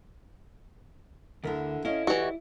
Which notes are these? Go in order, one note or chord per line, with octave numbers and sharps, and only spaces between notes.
D2 D3 E4 A#4
C#4 E4 D#5 F5
E3 F#4 G4 D5 D#5